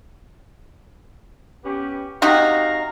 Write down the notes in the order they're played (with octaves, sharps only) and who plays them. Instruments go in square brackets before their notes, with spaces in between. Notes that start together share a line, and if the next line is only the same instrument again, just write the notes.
[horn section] B3 C#4 G4
[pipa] C3 D#4 F#4 [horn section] F5 A#5